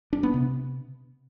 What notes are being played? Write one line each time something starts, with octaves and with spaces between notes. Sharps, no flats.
D4
B3
C3